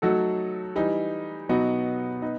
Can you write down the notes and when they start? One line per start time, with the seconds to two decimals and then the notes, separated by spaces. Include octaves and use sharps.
0.02 F#3 A3 D#4 F#4 A4
0.76 E3 G3 D#4
1.49 B2 F#3 B3 D#4 F#4
2.22 B3 D#4